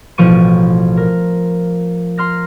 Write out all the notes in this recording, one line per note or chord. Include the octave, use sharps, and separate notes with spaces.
A1 B2 F3 C#6 D#7
A#4
A#5 C6 F6 A#6